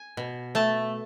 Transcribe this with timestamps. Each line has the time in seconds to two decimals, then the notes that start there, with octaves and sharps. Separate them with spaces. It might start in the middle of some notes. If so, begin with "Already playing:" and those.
Already playing: G#5
0.17 B2
0.55 A3 A5